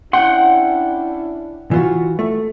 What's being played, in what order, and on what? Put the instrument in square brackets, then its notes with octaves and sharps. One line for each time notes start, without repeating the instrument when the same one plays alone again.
[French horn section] C#4 D4 E4 [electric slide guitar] F#5 G5 [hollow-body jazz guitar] C6
[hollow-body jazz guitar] E3 F4 F#4
A3